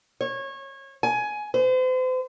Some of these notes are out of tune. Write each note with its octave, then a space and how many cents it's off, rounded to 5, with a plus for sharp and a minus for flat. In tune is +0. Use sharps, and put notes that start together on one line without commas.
C#5 -25
G#5 +15
C5 -40